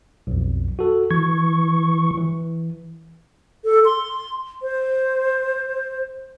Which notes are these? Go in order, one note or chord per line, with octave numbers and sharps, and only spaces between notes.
B1 F2
F#4 A4
E3 C#6 G#6
E3
A4
C6
C5